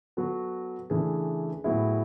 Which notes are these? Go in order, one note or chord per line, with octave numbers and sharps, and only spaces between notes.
F#3 B3 F#4 A4
C#3 E3 A3 D4 G#4
A2 F#3 B3 E4 G#4